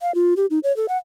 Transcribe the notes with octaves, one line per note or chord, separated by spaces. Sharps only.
F5
F4
G4
D#4
C#5
A4
F#5